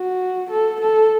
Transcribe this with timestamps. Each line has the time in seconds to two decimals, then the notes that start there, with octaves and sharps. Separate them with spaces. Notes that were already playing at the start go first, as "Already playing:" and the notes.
Already playing: F#4
0.50 A4
0.81 A4